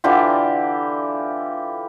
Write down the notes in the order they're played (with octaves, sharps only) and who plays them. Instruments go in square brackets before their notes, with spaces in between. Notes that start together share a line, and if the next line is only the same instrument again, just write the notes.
[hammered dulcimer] D3 E3 F4 G4